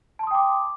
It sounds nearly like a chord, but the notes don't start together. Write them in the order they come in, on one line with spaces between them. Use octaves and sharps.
A5 C6 D#6 G5 D6